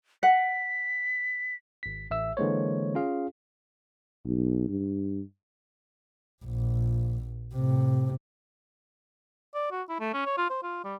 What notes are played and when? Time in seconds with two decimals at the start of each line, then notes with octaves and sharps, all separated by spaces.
0.23 F#5 B6
1.83 G#1 B6
2.11 A1 E5 E6
2.37 D3 E3 G#3 A#3 C5 C#5
2.95 C#4 F4 G#4 F5
4.25 B1
4.69 G2
6.45 A#1
7.54 A2 C3
9.54 D5
9.71 F#4
9.89 E4
10.00 A3
10.13 C#4
10.25 C#5
10.38 F4
10.50 C5
10.63 F4
10.84 G3